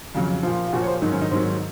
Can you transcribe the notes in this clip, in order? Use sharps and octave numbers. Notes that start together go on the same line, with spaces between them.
F2 C#3 F#3
A#2 F3
F4
A#2 F3 F#4
C#5
C5
G#2 D#3 F#3 D#4
C#4
D#4
G#2 D#3 F#3 C4